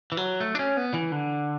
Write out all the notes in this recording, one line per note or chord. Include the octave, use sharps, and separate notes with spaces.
E3
F#3
A3
D4
C#4
B3
E3
D3